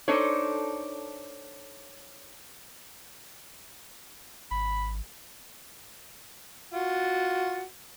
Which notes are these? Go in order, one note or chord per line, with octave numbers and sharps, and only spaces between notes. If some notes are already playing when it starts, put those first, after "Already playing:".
D4 D#4 A4 C5 C#5
G#1 B5
F4 F#4